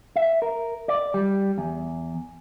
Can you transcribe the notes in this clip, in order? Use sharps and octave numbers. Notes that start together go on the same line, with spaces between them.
E5
A#4
D5
G3
E2